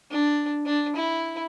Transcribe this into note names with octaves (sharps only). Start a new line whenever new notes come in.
D4
D4
E4